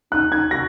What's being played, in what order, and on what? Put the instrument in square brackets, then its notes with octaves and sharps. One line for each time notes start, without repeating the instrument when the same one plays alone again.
[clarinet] D#4 [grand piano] F#6
[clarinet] D#4 [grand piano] G#6
[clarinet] F#4 [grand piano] A#6